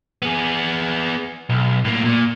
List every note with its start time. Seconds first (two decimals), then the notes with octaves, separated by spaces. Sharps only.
0.22 B3 G#4
1.49 B1
1.85 A2 A#3
2.05 A#2